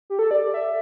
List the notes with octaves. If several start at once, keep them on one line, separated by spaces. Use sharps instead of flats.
G4
A4
D5
D5
E5